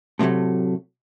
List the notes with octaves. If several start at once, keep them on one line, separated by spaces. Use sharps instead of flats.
A2 C3 F3 F#3 A3